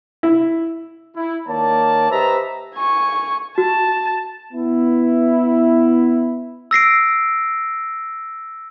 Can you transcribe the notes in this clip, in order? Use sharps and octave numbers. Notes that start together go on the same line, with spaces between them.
E4
E4
D#3 A#3 C#5 D5 A5
G4 B4 C5 D#5 E5 A#5
G#5 C#6
F#4 A5
B3 E4
E6 A#6 C7 D7